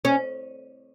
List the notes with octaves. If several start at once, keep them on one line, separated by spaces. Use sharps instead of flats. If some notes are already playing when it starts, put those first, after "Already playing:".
C#4